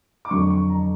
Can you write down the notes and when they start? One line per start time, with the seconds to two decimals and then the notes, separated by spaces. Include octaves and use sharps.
0.25 D6
0.31 F2 D3 F#3 C#6
0.50 C#6
0.70 A#5